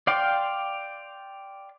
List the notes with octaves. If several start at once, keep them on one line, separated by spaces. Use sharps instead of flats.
D5 F5 G5 C6 D6